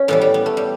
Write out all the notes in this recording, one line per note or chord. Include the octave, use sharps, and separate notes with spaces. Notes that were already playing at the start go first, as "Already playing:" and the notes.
Already playing: C#4
A2 E3 G3 B3
G3
B3
A3
G3